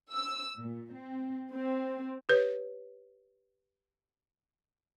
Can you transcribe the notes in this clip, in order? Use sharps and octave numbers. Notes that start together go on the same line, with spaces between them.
E6
A#2
C4
C4
G4 B4 C#5